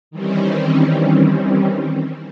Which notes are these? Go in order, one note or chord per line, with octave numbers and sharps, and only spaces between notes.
D#3 E3 G3 C4 C#4